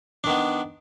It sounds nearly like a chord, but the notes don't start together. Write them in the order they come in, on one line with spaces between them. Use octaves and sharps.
D4 D#3 B3